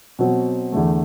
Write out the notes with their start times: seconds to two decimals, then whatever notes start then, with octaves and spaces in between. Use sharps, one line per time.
0.19 B2 F#3 C4
0.72 E2 D3 A3